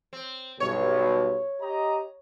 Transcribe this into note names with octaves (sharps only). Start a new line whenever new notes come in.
C4
B1 G2 B2 C#5
G4 D#5 A#5